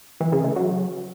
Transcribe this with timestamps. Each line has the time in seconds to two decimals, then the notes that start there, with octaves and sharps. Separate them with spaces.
0.20 E3
0.32 C#3
0.44 A3
0.56 F#3